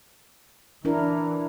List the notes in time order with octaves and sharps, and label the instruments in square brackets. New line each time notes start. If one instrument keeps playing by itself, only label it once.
[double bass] E3 [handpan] D4 E4 A#4